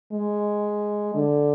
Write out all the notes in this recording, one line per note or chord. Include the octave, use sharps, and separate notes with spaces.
G#3
D3